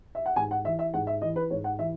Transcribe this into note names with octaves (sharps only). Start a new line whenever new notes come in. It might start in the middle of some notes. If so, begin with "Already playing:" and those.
E5
F#5
G#2 G#5
F#5
E3 E5
E5
G#2 F#5
E5
E3 D#5
B4
G#2 C#5
F#5
E3 E5